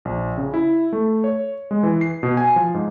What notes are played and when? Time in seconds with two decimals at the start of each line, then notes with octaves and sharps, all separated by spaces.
0.05 A#1
0.38 C#3
0.54 E4
0.93 A3
1.24 C#5
1.71 G#3
1.83 E3
2.01 C7
2.23 B2
2.37 G#5
2.56 F3
2.74 G#2